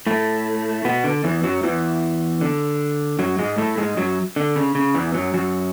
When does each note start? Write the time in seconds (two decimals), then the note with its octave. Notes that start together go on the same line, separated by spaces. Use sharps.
0.07 A2 A3
0.85 B2 B3
1.04 D3
1.24 E2 E3
1.43 F#2 F#3
1.63 E2 E3
2.41 D3
3.19 F#2 F#3
3.38 G#2 G#3
3.58 A2 A3
3.78 G#2 G#3
3.97 F#2 F#3
4.36 D3
4.56 C#3
4.75 C#3
4.94 E2 E3
5.14 F#2 F#3
5.34 F#2 F#3